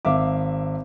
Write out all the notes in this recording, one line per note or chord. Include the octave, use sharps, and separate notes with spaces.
G#1 E5 F5 D6